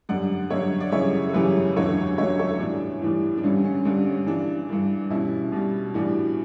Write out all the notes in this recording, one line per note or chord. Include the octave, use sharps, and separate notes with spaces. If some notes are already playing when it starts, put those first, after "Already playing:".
F#2 D3 G3 D5 F#5
F#2 D3 G3 C#5 E5
D5
F#2 C#3 E3 G3 C#5 E5
A4
F#2 C#3 E3 G3 G4 B4
E2 D3 F#3 A4 C#5
E2 D3 F#3 C#5 E5
A4 C#5
A2 E3 G3 D4
A2 E3 G3
D4
G2 D3 G3 C#4
C#4
G2 D3 G3 D4
C#4
G2 E3 G3 D4
G2 E3 G3
B2 G3 C#4 E4
B2 G3
A2 E3 G3 D4 F#4